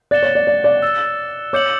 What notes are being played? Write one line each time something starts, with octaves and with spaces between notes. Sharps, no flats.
D5 F#6 A6 C#7 E7 G7
C#5
D5
D5
D5
E6 A6 E7
C#5 D6 G6 C#7 F#7